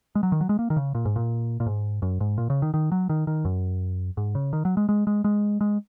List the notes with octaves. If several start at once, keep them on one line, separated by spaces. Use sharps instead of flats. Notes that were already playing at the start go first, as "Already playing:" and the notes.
G#3
F#3
D#3
F#3
G#3
A#3
D#3
C#3
A#2
G#2
A#2
A#2
G#2
F#2
G#2
A#2
C#3
D#3
D#3
F#3
D#3
D#3
F#2
G#2
C#3
D#3
F#3
G#3
G#3
G#3
G#3
G#3